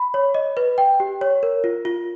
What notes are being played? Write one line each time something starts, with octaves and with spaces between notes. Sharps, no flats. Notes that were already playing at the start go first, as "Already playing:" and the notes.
Already playing: B5
C#5
D#5
B4
G5
G4
C#5
A#4
F4
F4